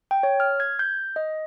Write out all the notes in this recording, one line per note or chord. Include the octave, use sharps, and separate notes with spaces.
G5
C#5
F6
G#6
G6
D#5